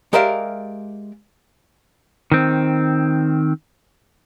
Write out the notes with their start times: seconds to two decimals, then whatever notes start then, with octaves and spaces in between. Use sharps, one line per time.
0.13 G#3 G4 A#4 D5 E5 F5
2.32 D#3 C4